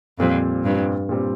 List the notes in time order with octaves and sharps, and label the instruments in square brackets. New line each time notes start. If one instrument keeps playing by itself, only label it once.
[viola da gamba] F2 [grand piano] A#2 G3 C4
[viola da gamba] G2
[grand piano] A#2 G3 C4